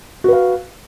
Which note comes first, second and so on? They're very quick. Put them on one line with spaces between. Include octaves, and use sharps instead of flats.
F#4 B4 F5